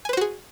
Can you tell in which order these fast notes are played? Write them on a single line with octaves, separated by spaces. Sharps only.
G#5 B4 C5 F#4 G#4